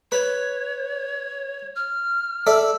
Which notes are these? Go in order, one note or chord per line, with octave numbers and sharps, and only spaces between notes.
B4 C#5
F6
A4 D5 E5